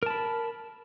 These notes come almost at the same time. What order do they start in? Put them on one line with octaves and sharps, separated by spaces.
A#4 A5 B5